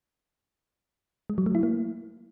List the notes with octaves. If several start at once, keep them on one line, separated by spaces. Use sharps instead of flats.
G#3
F#3
A3
E4
A#3